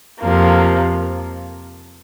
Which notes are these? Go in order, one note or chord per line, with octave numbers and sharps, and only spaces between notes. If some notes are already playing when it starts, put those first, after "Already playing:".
F2 C3 F3 A#3